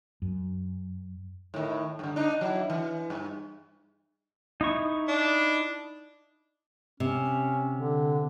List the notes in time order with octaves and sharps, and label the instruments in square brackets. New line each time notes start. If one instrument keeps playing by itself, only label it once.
[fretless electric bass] F#2
[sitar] A2 D#3
G2 D3
D4 D#4
F#3 E4
E3
G2
[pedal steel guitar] D#4 E4 C#6
[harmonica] D4
[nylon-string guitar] C3 [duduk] C#4
[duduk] D3